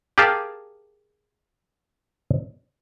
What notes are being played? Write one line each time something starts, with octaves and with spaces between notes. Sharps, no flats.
G4 G#4 A#4 F5 A5